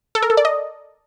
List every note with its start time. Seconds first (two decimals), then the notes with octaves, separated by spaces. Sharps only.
0.15 A4
0.22 A#4
0.30 A4
0.37 D5
0.45 D#5